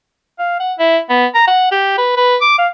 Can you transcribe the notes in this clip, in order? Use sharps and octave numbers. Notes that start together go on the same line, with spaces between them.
F5
F#5
E4
B3
A#5
F#5
G4
B4
B4
D6
F5